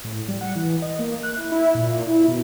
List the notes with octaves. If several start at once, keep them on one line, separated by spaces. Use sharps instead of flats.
A2
G3
F#5
E3
D#5
A#3
F#6
E4
E4
A#2
E4
B2